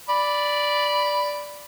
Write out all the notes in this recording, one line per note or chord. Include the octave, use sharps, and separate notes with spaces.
D5 B5